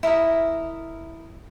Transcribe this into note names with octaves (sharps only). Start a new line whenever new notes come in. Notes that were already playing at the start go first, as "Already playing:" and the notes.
E4 A#4 D#5 E5